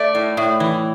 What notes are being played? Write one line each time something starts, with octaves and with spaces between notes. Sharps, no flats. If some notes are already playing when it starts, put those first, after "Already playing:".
Already playing: A3 D5
A2
A2
E3